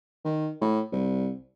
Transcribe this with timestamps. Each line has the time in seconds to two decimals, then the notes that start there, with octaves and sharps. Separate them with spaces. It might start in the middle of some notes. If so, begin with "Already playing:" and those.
0.25 D#3
0.61 A2
0.92 C2